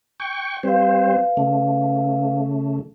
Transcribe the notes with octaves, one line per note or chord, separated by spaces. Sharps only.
G5 C#6
G3 C4 B4 C5 F5
C#3 A3